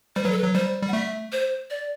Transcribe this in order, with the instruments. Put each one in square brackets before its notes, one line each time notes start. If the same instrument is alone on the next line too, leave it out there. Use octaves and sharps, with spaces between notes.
[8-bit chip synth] G3 [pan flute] C5
[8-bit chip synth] F#3 [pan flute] B4
[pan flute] A4
B4
[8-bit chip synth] F#3
[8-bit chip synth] G3 [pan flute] C5
[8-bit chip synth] G3
[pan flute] F#5
[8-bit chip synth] A3 [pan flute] E5
[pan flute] C5
D5